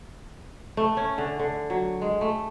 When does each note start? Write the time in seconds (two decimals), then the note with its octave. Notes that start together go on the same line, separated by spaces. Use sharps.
0.77 A3
0.97 C#4
1.18 D3
1.39 D3
1.70 F#3
2.02 G#3
2.21 A3